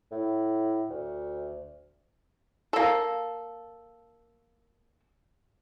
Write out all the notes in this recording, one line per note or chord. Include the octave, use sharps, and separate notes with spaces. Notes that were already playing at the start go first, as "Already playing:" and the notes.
A2
D2
A#3 A4